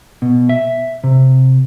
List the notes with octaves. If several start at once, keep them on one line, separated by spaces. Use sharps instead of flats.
B2
E5
C3